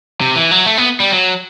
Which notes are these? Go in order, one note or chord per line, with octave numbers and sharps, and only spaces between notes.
C3
E3
F#3
A3
B3
G3
F#3